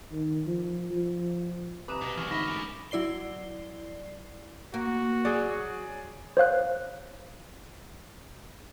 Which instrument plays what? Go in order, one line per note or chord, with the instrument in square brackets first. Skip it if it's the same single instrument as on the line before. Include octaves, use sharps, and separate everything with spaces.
[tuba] D#3
F3
F3
[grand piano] C2 A#5 [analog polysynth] B4 [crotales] D6 D#6 E7
[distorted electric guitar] B2 [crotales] D6
[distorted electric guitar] E2 G#3 [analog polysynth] E3 [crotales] C#6 F6
[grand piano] D2 B5 [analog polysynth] G#2 [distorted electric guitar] D#5 E5 [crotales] C#6 A#6
[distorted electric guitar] C#4 A#4
[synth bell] F#3 E4 D5 C7 G7
[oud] A#3 [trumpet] F#4
[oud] F#3 [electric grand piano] G#4 D5
[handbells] C5 C#5 F5 F#6